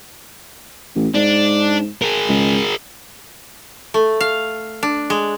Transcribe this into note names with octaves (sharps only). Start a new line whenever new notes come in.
A1
G#2 D4
G#4 A#4
C#2
A3
F5
D4
G#3